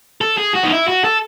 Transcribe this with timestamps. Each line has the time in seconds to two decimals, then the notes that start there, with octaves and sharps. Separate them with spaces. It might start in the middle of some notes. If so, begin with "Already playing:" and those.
0.21 A4
0.37 G#4
0.54 F#4
0.64 D#4
0.71 E4
0.88 F#4
1.04 A4